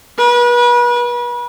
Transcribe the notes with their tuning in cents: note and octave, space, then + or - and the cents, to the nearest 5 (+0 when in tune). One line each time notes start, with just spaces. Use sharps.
B4 -35